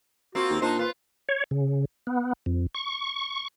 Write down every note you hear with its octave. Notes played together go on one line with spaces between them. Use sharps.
A#3 C4 F4 F#4
D#2
A#2 D4 D#4 C5
F4 B4
C#5
C#3
B3
F2
C#6